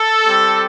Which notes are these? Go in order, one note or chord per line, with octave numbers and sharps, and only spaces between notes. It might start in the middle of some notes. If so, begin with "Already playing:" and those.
Already playing: A4
G3 C4 G4